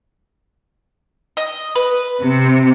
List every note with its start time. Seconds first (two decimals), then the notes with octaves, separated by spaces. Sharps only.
1.37 D#5
1.75 B4
2.22 C3